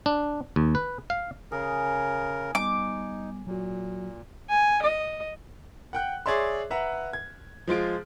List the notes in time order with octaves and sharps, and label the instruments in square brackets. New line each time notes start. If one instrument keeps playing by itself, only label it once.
[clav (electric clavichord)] D4
D#2
B4
F5
[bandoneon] C#3 A#4 [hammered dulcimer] G#4
[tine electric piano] G3 B3 [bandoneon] D#4 [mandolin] D6
[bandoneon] A#2 [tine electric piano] F#3 F#4
[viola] G#5
D#5
[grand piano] F#5 G5 F#6
G#4 C#5 D5 E5 C6
B4 E5 F#5 A#5
G#6
F3 G#3 F4 D7